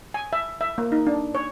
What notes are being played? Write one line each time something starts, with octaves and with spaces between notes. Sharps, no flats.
G#5
E5
E5
A#3
D#4
D4
C#5